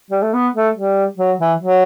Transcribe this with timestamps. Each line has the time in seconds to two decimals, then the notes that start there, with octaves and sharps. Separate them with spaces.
0.11 G3
0.22 A3
0.34 B3
0.55 A3
0.76 G3
1.18 F#3
1.39 E3
1.60 F#3